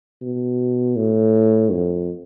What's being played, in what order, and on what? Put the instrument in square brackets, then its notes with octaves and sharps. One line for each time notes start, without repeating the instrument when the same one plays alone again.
[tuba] B2
A2
F2